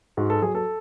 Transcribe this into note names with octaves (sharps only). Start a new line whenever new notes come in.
G#2 F#4
A4
F#3 G#4
A4